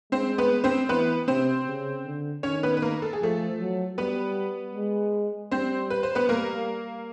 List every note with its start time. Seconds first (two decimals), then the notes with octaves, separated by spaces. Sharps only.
0.12 G#3 C4 C5
0.38 B3 B4
0.64 C4 C5
0.89 E3 B3 B4
1.28 C3 C4 C5
1.67 C#3
2.05 D3
2.43 D#3 C#4 C#5
2.63 B3 B4
2.77 B4
2.82 A#3 A#4
3.02 A4
3.13 G#4
3.21 F3 A3 A4
3.60 F#3
3.97 G3 B3 B4
4.75 G#3
5.51 G3 C4 C5
5.90 B4
6.03 C5
6.15 B3 B4
6.29 G3 A#3 A#4